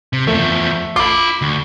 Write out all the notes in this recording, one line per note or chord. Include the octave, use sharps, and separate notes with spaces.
C3
E2 F3 A3
F4 B5 D6
D2